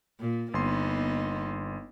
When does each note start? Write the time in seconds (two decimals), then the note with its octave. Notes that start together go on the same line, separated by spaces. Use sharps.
0.20 A#2
0.54 G1 A#3 B3 D#4 C6